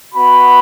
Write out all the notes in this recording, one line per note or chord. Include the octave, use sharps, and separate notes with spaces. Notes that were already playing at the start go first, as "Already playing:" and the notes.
B3 F#4 B5